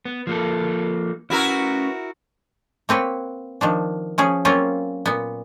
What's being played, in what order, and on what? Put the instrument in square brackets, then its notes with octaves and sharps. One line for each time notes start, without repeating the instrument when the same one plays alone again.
[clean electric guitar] B3
F3 A#3 A4
[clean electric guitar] C#4 B4 [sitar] E4 F#4 A#4
[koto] A#3 C4 B4 C#5
D#3 F3 D4
F3 C#4 G#4
F#3 A#3 C4 C#4 F4
A#2 B3